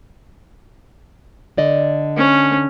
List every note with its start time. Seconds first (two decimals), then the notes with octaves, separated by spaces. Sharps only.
1.57 D3 D5 D#5
2.17 C#4